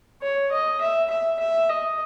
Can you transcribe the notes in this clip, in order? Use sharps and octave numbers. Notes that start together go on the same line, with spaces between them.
C#5
D#5
E5
E5
E5
D#5